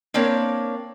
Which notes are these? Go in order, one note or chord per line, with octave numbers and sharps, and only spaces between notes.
A#3 C4 D4 A#4 C#5